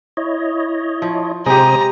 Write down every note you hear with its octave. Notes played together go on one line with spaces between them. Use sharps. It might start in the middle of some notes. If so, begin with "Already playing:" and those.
E4 C#5 D#5
F3
C3 G#3 G4 C5 A#5 D#6